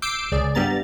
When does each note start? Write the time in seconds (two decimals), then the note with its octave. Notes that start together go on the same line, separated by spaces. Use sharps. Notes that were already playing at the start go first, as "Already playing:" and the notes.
0.02 D6 E6 G6 C7 D7
0.32 C#2 G#4 D5
0.55 G2 G3 B3 A#5 A6